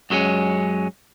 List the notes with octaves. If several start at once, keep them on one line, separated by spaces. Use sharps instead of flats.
F#2 F#3 G#3 B3 C#4